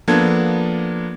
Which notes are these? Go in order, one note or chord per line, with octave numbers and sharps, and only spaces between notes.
F3 A#3 B3 D4 A4 G#6